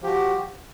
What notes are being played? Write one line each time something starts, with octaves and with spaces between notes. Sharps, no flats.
F3 F#4 G4